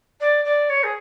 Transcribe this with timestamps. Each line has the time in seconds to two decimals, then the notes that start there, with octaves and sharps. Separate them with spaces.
0.20 D5
0.44 D5
0.69 C#5
0.83 G#4